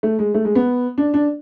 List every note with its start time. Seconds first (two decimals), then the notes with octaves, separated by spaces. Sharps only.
0.03 A3
0.19 G#3
0.34 A3
0.45 G#3
0.55 B3
0.98 D4
1.14 D4